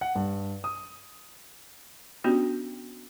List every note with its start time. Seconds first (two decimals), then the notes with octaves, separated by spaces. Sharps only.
0.01 F#5
0.15 G2
0.64 D#6
2.24 B3 C#4 D4 F#4 G4